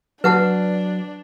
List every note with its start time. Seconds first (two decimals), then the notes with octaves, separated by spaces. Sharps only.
0.24 F#3 D4 B4 F#5 A5